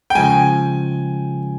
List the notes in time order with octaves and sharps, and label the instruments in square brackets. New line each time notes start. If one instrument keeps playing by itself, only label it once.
[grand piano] G5
[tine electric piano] C#3 F3 G#3 [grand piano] G#5